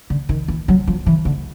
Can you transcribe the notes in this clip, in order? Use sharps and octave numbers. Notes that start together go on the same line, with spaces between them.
D3
D#3
E3
F#3
F3
E3
D3